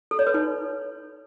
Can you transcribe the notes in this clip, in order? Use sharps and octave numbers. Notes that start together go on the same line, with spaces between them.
A4
C#5
B4
D#4